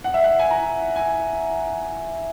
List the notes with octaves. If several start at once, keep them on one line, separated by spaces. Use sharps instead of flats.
F#5
E5
F#5
G#5
A#5
G#5